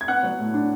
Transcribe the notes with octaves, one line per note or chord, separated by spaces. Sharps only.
G#6
B3 F#5 F#6
F#3
A2
D4